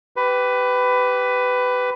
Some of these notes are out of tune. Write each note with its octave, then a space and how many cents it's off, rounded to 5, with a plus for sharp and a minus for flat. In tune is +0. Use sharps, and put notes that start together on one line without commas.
G4 -15 B4 +15